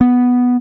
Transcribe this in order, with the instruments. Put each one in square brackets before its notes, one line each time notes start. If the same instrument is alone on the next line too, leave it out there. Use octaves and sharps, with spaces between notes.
[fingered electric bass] B3